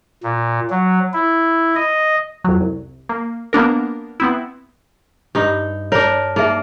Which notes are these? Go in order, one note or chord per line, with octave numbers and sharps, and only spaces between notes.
A#2
F#3
E4
D#5
F2 F#3
C2
A#3
A#3 B3 D4 A#4
B3 C4 E4
G2 D#4
D4 A#4 C#5
A#3 D#4 G#4 E5